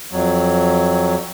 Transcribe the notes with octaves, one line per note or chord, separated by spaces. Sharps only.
F2 F#3